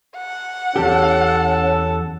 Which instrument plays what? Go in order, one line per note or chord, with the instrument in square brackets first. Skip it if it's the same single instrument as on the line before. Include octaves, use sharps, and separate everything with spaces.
[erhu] F#5
[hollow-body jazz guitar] E2 G4 [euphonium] C#4 [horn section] A4 A5